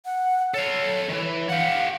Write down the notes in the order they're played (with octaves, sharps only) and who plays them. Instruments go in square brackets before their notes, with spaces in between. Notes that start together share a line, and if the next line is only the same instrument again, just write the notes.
[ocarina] F#5
[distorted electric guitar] A4 F5 [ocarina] C#5
[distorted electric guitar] D#3 E3
[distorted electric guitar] G4 F#5 [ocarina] F5